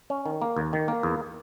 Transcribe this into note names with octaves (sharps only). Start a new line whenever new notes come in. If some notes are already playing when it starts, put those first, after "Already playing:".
C#4
D#3
A#3
D#2
D#3
A#3
E2